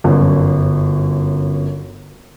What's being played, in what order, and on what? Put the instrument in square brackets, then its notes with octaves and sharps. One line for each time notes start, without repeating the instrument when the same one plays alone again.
[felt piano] G1 F#2